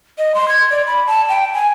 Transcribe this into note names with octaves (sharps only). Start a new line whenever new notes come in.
D#5
C6
G#6
D5
B5
A5
G5
G#5